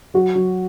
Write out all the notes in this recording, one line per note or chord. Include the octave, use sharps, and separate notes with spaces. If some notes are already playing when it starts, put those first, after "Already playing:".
F#3 F#4
F#3